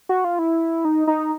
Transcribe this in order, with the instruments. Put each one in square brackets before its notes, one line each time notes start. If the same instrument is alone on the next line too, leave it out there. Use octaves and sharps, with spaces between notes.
[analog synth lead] F#4
F4
E4
D#4
D#4